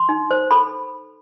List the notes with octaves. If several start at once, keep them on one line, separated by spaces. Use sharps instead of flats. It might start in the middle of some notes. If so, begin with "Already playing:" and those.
Already playing: C6
D#4
C5
A4 B5